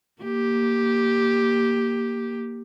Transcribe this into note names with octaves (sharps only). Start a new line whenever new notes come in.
A#3 G4